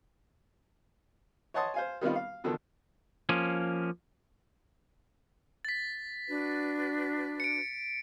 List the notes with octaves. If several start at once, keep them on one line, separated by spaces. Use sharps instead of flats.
C#5 D#5 F#5 A5 C6 D#6
C5 F5 G#5
D#3 G3 B3 C4 D#4 F4
F5
B2 D3 D#3 F3
F3 A#3 C#4
A6 B6
D4 F#4 B4
C#7 D7